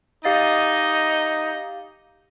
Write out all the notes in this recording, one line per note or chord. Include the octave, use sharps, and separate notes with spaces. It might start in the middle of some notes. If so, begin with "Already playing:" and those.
D#4 G4 D#5 F5 A6